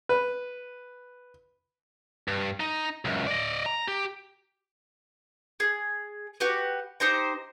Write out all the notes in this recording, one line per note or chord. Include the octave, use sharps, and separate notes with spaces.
B4
G2
D#4
C#2 F#2
D5 D#5
A#5
G4
G#4
F#4 G4 B4
D#4 G4 C5 A#5